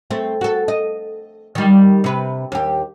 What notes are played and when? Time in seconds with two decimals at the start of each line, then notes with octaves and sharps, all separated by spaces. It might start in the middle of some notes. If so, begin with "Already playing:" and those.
0.10 A3 C4
0.41 F#4 A4
0.68 D#5
1.55 D#3 G3
2.04 C3 B4
2.52 D#2 G4